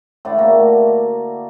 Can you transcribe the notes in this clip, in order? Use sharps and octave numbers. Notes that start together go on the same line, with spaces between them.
A2 D3 D5
A#3 F#4